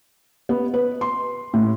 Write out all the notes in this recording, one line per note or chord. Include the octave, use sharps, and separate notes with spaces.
B3
B4
C6
A2